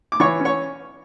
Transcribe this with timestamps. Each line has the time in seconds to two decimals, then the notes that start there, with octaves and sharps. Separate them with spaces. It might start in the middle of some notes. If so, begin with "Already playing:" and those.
0.12 D6
0.20 E3 C#5 C#6
0.40 C#4
0.45 C#5 C#6